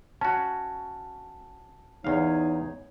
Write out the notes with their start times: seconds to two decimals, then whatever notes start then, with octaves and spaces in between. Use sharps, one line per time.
0.21 C#4 F#4 A5
2.04 E2 D#4 C#5 F5